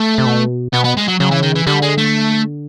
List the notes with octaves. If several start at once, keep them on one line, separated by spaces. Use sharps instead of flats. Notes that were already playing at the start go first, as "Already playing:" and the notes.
Already playing: A3
C3
B2
B2 B3
B3
G#3
F#3
C#3 F#3
E3
D#3
E3
D3 G3
G#3
A3